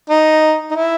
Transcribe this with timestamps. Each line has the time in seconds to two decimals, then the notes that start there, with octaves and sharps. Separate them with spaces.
0.10 D#4
0.70 D#4
0.75 E4